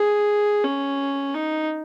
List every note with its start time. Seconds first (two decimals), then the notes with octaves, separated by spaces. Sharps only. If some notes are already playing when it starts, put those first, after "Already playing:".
Already playing: G#4
0.64 C#4
1.34 D#4